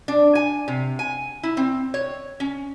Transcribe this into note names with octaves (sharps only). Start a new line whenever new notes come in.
D4
G#5
C3
G#5
E4
C4
C#5
C#4